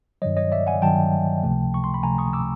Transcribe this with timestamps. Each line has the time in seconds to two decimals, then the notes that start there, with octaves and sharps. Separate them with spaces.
0.22 G2 D#3 F#3 C#5 D#5
0.37 C#5 D#5
0.52 D5 E5
0.67 F#5 G#5
0.82 G2 D#3 F#3 G5 A5
1.43 C#2 C3 F3 A3
1.74 C#6
1.84 C6
1.94 B5
2.03 C#2 C3 F3 A3 G#5 A#5
2.18 C#6 D#6
2.33 D6 E6